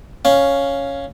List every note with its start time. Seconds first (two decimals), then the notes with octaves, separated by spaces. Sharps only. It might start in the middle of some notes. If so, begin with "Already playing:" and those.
0.25 C#4 F5